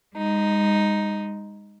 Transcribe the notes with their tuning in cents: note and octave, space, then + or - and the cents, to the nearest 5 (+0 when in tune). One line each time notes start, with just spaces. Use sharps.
G#3 -35 D#4 +0